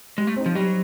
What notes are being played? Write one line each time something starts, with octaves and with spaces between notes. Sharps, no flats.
G3 G#3
A3
C4 D#4
F3
F#3 G3